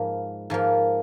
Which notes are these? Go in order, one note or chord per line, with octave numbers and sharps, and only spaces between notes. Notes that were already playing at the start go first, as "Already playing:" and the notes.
Already playing: G#2 F3 A#3 F5
G#2 F3 A#3